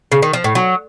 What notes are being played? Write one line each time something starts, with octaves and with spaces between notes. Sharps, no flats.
C#3
D#3
F3
A2
F#3